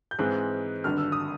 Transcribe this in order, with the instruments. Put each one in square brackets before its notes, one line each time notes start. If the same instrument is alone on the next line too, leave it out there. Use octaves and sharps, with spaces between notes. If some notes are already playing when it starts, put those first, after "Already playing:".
[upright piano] G6
G#2 E3 G#3 C4 F#6
G#1 G2 D3 F6
E6
D#6